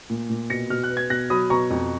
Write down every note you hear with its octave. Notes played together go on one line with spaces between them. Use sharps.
A#2
A#2
B2 A#6 C#7
B2 F6
F#6
B3
G#6
B2 F#6 A#6
F#3 B5 D#6
B2 A#5 C#6
F2